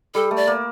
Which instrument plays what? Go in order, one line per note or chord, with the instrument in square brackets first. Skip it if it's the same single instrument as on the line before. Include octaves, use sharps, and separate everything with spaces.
[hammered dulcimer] G3 [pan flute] A4
[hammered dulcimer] A3
[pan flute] D5
[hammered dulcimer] A#3